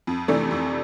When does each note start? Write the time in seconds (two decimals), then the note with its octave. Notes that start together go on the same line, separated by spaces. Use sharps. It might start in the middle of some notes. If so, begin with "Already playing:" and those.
0.07 F2
0.28 C3 E3 A3 D4
0.51 F2